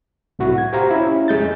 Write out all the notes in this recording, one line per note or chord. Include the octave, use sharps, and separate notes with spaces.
C2 A2 E4 F#4
G#6
G4 C5 F5 A#5
C#4 E4
F2 G#3 G6 A6